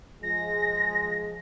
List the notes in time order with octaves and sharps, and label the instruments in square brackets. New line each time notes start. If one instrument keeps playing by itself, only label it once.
[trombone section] F3 G#3 [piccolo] A#6